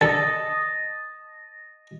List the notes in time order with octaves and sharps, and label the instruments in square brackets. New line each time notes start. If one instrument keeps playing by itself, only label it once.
[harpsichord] D3 A4 [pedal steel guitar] D#5 A5